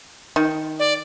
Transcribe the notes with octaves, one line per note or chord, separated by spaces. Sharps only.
D#3
D5